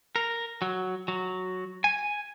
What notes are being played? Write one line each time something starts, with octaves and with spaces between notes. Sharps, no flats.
A#4
F#3
F#3
G#5